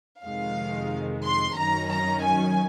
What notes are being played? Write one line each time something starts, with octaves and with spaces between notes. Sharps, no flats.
F2 C3 D#3 G#3 F5
C6
F#2 D#3 F#3 C#4 A#5
A#5
G#5